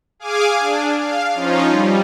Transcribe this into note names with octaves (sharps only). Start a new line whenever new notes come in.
G#4 F5 G#5 D6
D4
F5
F3 C#4 D#4 F4
G3